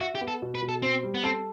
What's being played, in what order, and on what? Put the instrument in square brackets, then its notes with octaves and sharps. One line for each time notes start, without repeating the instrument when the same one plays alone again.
[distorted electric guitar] F#4 [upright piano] E5
[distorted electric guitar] G4
[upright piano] B3
[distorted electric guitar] A4
[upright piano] B2
[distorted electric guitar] B4
[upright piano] B2
[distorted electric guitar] A4
[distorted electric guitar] C4 [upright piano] C5
[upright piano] G3
[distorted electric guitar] B3
[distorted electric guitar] C4 [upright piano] A4